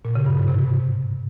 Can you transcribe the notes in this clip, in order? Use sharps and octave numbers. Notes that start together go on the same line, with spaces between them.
A#2
C#3
G2
G#2
C3